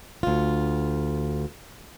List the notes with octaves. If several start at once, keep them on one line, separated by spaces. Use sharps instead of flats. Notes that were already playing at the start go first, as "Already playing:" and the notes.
D2 F4